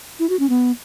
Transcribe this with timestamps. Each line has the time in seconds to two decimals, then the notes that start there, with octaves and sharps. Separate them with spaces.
0.19 E4
0.29 F#4
0.39 C#4
0.49 B3